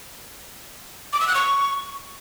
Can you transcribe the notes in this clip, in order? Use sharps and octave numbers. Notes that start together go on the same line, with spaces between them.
D6
E6
F#6
C#6